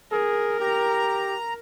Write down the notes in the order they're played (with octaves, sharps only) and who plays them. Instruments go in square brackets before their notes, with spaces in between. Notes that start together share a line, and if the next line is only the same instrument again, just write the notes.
[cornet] G#4 [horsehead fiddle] A#4
[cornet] G4 [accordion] A#5